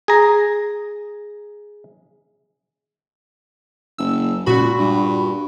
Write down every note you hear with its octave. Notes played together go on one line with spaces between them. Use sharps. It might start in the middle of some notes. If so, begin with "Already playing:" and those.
G#4 A#5
F#1 E6
C#2 A#2 F#4 B5
G2